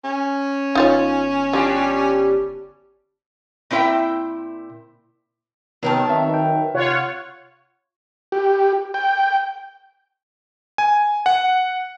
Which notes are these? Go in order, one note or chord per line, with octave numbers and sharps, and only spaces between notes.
C#4
G1 D#4 F4 C#5
F3 G3 D4 G4
A#2 C4 E4 C5 E5 G5
C3 D#3 F#3 B3 A#4 G5 A5
C4 E5
B4 G5
C3 F4 C#5 F#5
G4
G5
G#5
F#5